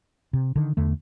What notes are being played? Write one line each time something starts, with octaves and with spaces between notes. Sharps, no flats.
C3
D3 D#3
E2 D3 A3